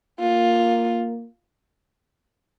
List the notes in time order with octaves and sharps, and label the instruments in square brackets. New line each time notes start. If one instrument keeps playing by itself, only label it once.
[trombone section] A#3 [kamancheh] F4